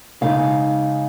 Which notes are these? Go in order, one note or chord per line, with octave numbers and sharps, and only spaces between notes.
C#3 G#3 D#4 F5